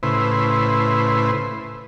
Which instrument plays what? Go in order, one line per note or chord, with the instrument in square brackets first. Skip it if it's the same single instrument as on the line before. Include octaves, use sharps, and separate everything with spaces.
[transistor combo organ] A2 C#3 E4 B4 C5